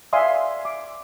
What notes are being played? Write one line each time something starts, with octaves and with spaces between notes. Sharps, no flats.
D5 E5 F5 G#5 C6 D#6
D6